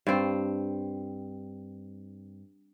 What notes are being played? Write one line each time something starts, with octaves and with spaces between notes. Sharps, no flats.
G2 C4